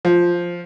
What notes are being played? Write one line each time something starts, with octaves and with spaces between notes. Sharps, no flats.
F3